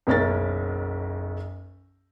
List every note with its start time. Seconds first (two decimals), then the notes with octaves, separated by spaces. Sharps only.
0.07 F#1 B1 C#4 A#4 A6